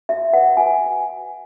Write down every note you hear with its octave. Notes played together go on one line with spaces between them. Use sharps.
F#4 E5
B4 F#5
F#4 G#5